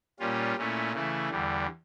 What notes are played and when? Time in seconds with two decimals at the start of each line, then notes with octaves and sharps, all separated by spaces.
0.19 A#2 G3 C#4 F4
0.57 A#2 A3 C#4 E4
0.92 C#3 E3 A3 E4
1.30 E2 D3 G3